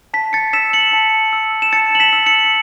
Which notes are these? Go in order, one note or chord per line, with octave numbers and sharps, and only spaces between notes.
A5 B6
A6 C#7
E6 B6 E7
C#7 F#7
A5
E6
E7
A5 A6 C#7
F#7
B6 E7
E6
C#7 F#7